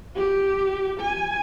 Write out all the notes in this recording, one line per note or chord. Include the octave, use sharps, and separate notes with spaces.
G4
G#5